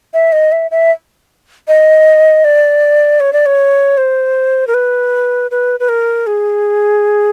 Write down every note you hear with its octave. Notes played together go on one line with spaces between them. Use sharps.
E5
D#5
E5
E5
D#5
D5
C#5
D5
C#5
C5
A#4
B4
B4
B4
A#4
G#4